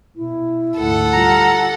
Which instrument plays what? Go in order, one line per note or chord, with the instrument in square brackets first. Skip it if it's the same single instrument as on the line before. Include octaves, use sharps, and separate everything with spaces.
[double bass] B2 [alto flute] E4
[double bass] D2 G#2 [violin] A4 F#5
[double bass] G3 [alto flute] F4 [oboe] A#5